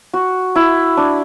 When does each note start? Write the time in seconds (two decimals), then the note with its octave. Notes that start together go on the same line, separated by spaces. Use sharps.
0.13 F#4
0.55 E4
0.97 D4